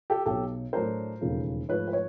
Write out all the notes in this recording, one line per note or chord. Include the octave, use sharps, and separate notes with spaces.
G4 A4
B1 B2 F#3 G4 A4
A2 F#3 A3 D4 A#4 C5
E1 D#2 C#3 F3 A3
G#2 F3 A3 B4 C#5
C5
B4 C#5